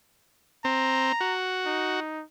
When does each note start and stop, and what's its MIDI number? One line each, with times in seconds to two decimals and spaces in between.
0.65 1.12 60
0.65 1.34 82
1.21 2.00 66
1.66 2.23 63